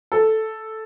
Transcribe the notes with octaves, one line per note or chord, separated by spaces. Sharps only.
A4